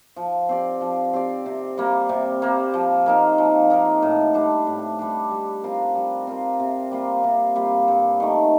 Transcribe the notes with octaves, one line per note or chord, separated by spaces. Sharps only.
F3
C4 G4 D5
F3
C4 G4 D5
C3
G3 A#3
C3
G3 A#3
F3
A#3 D#4 A#4
F3
A#3 D#4 A#4
A2
G3 D4
A2
G3 D4
G3
C4 F4 A#4
G3
C4 F4 A#4
C3
G3 A#3 F4
C3
G3 A#3 F4
G2
D#3 A3